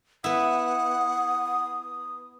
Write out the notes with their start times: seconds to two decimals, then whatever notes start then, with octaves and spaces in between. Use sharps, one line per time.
0.24 B3 E4 F#5 D#6